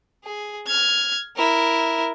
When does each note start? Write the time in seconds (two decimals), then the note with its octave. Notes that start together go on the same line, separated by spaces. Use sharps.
0.24 G#4
0.67 F6 G#6
1.36 E4 A#4